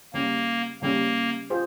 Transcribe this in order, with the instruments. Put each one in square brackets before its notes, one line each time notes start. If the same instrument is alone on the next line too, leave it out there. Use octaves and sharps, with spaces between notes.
[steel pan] C#3 G3 C#4 [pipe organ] A#3
[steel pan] C#3 G3 C#4 [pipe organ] A#3
[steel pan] F4 G#4 C5